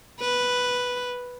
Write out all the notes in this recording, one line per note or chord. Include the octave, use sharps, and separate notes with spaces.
B4